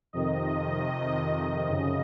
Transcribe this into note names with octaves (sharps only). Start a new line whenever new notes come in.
F2 C3 D#3 D#5
F#2 C#3